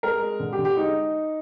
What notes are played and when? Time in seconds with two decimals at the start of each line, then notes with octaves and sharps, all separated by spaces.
0.03 G#3 A#4
0.21 G#3
0.40 D3
0.53 G4
0.58 D3
0.65 G4
0.77 G#3 D#4